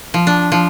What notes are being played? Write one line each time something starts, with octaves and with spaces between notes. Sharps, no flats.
F3
D4
F3